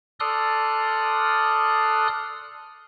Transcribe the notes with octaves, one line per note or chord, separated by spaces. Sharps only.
A4 D5 C6 D#6 F6 F#6